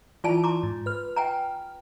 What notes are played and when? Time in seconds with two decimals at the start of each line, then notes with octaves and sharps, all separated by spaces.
0.24 E3 E4 F4 D5 G#5 A5
0.44 A#5 C6 D6
0.63 G#2
0.86 B4 F6
1.16 G5 G#5 A#5